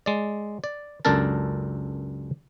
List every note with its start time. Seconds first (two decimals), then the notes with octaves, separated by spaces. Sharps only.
0.06 G#3 D5
0.64 D5
1.05 C#2 F#2 D4 A4 A#4 A5